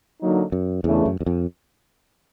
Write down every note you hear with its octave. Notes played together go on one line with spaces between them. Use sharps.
D3 F#3 A#3 D#4
F#2
E2 C#3 E3 A3 D4
F#2
E2
F2